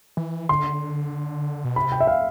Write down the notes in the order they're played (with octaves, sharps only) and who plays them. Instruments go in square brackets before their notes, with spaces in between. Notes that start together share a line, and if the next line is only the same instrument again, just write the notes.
[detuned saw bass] E3
[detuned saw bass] D3 [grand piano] C6
[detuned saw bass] B2
[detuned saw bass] C3 [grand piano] B5
[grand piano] G5
E5
F5